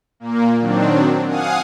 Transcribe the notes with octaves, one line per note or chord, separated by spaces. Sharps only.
A#2 A#3
D#3 F#3 C4 D4
F5 F#5 G#5 D#6